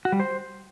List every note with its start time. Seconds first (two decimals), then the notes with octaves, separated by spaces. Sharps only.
0.05 F#4
0.12 G3
0.20 C5